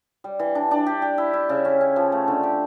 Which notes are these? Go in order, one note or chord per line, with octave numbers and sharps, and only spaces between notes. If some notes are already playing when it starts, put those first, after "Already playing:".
G3
E3
D4
D4
G4
G4
E4
E4
C#3
C#4
C#4
F3
A3
D3
G4